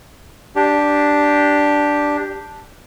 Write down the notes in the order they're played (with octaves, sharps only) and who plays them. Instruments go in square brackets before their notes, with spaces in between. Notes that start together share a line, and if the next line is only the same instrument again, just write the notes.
[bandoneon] D4 G4